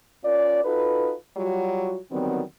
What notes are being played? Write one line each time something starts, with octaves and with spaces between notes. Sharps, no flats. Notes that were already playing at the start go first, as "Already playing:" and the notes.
C#4 F4 A#4 D5
D#4 F4 F#4 A4 B4
F#3 G3 F4 F#4
D3 D#3 F#3 G3 B3 C4